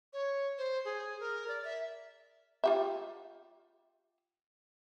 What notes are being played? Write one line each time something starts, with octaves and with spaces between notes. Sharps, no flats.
C#5
C5
G#4
A#4
D5
E5
F4 G4 E5